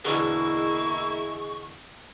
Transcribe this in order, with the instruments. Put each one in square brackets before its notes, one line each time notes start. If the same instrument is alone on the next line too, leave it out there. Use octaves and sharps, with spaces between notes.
[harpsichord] E2 B2 D3 [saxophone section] A#3 E4 [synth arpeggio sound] G#4 D#5 [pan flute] C#6